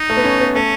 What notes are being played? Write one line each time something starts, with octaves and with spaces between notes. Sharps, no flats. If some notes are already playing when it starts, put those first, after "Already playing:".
Already playing: D#4
A3
B3
C#4
B3
A3 C#4